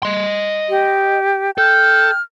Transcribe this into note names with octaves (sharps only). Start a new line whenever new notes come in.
D#5 C6
G4
A4 G5 F6